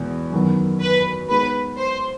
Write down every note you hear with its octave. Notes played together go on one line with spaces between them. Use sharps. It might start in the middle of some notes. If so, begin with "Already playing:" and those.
Already playing: E2 B2 G#3
F#2 D#3 F#3 B3
B4
G#3 B3 D#4 B4
C5